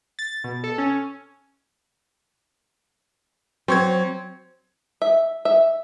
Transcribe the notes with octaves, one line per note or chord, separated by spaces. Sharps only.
A6
B2
A4
C#4
F#3 C4 C#6 G#6
E5
E5